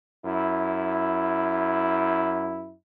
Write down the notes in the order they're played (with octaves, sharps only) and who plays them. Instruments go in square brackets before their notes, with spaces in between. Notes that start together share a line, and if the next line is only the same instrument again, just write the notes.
[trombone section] F#2 E4